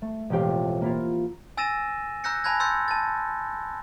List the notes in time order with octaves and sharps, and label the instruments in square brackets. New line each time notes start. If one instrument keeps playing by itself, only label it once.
[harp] A3
E1 A1 F2 G4 F5
A#3 E4 F4
[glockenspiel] G#5 E6 A6 A#6 D#7 E7
A#5 E6 F#6 G6 A#6 C#7
G#5 A5 B5 F#6 G#6 A#6
C6 E6 G6 A6 C#7
A5 A6